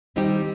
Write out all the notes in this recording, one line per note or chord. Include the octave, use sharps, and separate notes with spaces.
D#3 G3 C4 D#4 G4